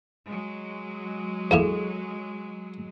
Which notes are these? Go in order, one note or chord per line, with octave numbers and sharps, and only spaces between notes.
F#3 G#3
E2 A#3 E4 G#4 A4